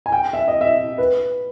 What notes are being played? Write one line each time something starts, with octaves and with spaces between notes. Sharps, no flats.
G#5
G5
E5
D#5
E5
B4